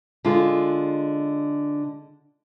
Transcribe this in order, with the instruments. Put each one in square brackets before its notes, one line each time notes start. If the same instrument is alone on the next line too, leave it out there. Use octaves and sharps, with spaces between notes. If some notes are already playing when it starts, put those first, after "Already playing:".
[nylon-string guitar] D3 G#3 F4